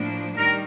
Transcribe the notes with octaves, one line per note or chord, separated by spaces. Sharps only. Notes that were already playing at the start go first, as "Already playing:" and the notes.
Already playing: A2 F3 A#3 D4
D#3 G3 A#4